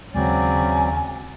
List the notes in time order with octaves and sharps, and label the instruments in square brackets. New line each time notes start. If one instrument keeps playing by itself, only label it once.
[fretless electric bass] D#2 G#3 [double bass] C#3 [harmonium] F#3 C4 D5 [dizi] G#5